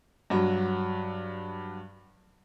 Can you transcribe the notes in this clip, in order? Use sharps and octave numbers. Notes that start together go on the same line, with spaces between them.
G2 F#3